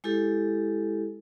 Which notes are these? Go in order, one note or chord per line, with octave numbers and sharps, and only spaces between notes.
G#3 E4 G4 A4